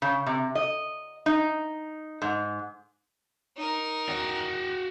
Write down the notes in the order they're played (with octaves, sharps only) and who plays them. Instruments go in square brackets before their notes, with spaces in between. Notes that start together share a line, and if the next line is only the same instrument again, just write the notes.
[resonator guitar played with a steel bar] C#3
C3
D#5
D#4
G#2
[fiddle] D#4 A#4
[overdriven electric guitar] F#4 G5